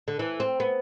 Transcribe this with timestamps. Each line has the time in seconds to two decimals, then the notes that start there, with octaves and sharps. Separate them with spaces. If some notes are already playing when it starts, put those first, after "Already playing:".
0.08 D3
0.19 E3
0.40 C4
0.60 B3